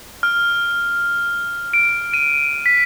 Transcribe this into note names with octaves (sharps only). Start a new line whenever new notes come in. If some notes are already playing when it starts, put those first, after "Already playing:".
F6
D7
D#7
B6